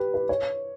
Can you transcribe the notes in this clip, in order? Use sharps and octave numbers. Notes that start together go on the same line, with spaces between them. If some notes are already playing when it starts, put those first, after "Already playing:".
Already playing: G4 B4
B4
C#5